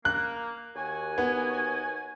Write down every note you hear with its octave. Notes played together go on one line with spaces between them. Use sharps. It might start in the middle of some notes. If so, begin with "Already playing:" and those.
A#3 F#6
D#2 F#4 G#5
B3